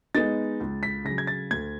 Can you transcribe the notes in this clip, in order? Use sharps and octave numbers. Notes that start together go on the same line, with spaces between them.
G#3 B3 D#4 A6
C#2
B6
C#3 F#3 A#6
G#6
A6
D2 G#6